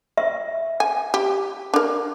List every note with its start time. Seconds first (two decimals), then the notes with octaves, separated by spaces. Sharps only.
0.18 E5
0.80 G#5
1.14 G4
1.74 D4 A#4